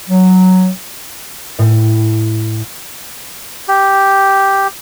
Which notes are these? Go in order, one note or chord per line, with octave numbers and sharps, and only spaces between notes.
F#3
A2
G4